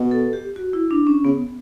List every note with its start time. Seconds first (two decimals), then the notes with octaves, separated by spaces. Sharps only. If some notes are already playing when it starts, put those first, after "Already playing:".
Already playing: B2
0.11 A4
0.33 G4
0.56 F#4
0.73 E4
0.91 D4
1.07 C#4
1.24 C#3 B3